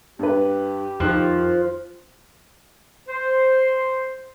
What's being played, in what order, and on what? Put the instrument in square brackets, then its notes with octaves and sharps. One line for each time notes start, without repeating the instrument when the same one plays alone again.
[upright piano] G2 B4 [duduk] G4
[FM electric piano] F2 D#4 [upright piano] D#3 F#6 [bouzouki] F3
[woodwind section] C5